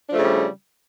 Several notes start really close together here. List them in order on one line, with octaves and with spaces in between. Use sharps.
D4 F3 A3 C#3 G3